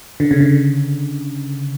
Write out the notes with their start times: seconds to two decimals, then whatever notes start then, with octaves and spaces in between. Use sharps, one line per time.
0.20 D3
0.31 C#3
0.40 D3